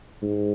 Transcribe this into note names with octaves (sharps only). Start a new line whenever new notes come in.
G#2